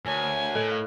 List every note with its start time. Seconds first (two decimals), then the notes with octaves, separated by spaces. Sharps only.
0.06 D2 A#4 C#5 G#5
0.55 A2 A4
0.69 F5 F6 F#6